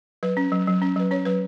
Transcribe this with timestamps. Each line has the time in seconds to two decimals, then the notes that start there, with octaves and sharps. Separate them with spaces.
0.23 F#3 B4
0.37 C#4
0.52 F#3
0.67 F#3
0.82 C#4
0.96 F#3 B4
1.11 C#4 C#5
1.25 F#3 B4